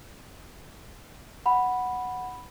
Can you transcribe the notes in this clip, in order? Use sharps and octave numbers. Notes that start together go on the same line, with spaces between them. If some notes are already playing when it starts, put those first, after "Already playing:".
F#5 B5